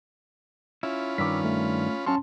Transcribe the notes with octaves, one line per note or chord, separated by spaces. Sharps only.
C#4 E4 F4 B5
G2 D#3 D6 E6 B6
A3
F#3 C#4 F5 A5 C6 C#6